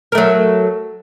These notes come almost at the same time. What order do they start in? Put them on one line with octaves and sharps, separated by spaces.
A#4 A3 F#3